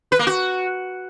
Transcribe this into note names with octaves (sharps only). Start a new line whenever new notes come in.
B4
A#3
F#4